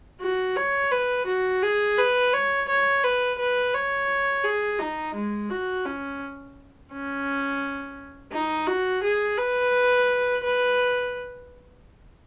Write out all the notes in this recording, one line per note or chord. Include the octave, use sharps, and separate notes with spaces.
F#4
C#5
B4
F#4
G#4
B4
C#5
C#5
B4
B4
C#5
G#4
D#4
G#3
F#4
C#4
C#4
D#4
F#4
G#4
B4
B4